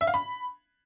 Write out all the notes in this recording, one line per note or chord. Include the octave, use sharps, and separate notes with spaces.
E5
F5
B5